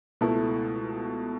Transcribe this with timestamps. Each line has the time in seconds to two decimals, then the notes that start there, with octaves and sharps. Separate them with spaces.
0.21 C#2 B2 A3 E4 A4